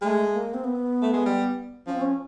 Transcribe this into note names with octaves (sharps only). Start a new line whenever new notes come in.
G#3 A3
A#3
C4
B3
A3
G#3
G3
F3 C#4
C4
C#4